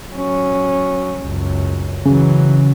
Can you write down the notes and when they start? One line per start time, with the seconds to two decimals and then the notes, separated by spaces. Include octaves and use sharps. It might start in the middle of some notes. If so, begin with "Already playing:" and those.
0.13 F#3 C#4
1.20 C#2 F#2
2.05 C#3 E3 F#3